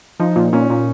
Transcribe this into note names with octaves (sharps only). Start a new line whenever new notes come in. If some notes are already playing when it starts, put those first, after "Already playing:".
F3 D#4
A#2
A#2 C#4
A#2